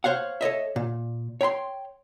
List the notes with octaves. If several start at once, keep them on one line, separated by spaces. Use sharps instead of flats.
C5 C#5 F5 F#5
A4 C#5 D#5 E5
A#2
C#5 G5 B5 C6